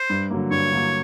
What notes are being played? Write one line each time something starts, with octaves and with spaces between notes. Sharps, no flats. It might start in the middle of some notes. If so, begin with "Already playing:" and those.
Already playing: C5
G2
D3 F#3 A#3
G2 C#5
D3 F#3 A#3